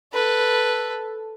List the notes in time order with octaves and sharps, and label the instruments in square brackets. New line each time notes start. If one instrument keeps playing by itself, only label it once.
[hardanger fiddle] A4 B4